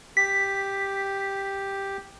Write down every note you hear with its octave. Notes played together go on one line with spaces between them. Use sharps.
G4 B6